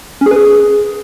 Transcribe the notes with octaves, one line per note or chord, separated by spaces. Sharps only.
C#4
G#4
B4
G#4